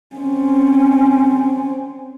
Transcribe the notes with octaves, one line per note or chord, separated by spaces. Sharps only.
C4 C#4